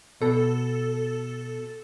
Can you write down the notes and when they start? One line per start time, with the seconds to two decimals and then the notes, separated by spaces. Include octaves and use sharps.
0.21 B2 A4